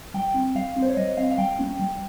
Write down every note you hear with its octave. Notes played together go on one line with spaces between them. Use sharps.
G3 G5
C4
G3 F5
C4
C5
C#5
G3 D#5
C4 F5
F5
G3 G5
A#3 C#4
G3